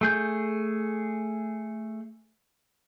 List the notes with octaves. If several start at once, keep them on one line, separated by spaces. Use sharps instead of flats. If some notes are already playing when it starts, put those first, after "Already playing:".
A3 G#4 G6